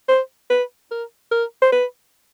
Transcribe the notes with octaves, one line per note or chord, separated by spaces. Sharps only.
C5
B4
A#4
A#4
C5
B4